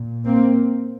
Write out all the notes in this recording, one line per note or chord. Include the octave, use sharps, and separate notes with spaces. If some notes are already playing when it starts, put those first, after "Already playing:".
Already playing: A#2
A#3 C4